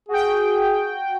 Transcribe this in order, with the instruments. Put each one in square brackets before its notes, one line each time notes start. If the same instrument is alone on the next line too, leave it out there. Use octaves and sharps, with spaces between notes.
[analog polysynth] F#4 G5 [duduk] G#4